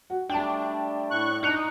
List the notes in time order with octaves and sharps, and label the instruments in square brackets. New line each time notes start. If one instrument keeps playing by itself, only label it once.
[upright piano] F#4
[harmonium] G3 A3 [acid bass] D4 [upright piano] G5 A5
[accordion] A2 C#6 F#6
[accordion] D4 [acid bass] D#4 [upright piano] F#6 C#7 F7